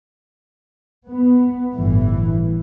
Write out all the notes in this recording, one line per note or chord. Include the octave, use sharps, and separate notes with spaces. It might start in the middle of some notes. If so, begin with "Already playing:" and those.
B3
G1 A2 E3